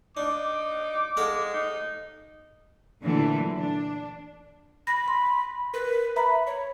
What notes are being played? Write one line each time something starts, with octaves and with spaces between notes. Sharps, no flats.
D4 D#4 D6
G#3 A4 F5 F#5
D#4
A#2 D3 E3 F#3 A3
D4
B5 A#6
C6
A#4 B4
E5 A#5 B5
C#5